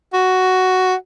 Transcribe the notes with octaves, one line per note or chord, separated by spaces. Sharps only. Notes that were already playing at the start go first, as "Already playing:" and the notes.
F#4